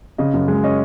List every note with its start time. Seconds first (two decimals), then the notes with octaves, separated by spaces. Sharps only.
0.18 C#3 D#5
0.34 F#2
0.48 G#3
0.63 C#4 D#5